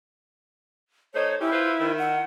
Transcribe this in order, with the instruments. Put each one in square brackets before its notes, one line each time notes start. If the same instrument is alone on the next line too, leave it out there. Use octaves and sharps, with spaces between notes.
[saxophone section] A3 D#4 C5 [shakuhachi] C#5
[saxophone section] G3 C#4 G4 [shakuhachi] E4
[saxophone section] F4 B4 C5
D#3
[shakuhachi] F#5